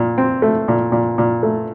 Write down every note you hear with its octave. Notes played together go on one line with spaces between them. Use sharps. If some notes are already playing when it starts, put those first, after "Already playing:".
Already playing: A#2
C4
A3
A#2
A#2
A#2
A3